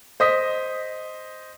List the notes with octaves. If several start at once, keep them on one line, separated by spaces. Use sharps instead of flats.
C5 D#5 D#6 B6